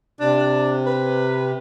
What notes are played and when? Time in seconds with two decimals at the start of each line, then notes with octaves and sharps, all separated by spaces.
0.20 C3 D4
0.86 B4